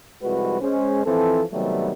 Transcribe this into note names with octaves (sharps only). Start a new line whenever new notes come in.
C2 F2 G#3 F#4 B4
G#3 C#4 C5
E3 F3 C4 A4
C3 D#3 F#3 G3 A3 B3